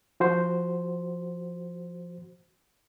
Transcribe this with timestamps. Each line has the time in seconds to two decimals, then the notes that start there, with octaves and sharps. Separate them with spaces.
0.20 F3 F#4 C5